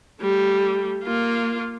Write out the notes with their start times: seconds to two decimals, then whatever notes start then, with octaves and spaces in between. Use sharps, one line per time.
0.21 G3 A3
1.03 A#3 F4